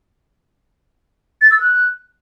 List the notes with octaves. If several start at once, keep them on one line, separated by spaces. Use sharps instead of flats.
A6
E6
F#6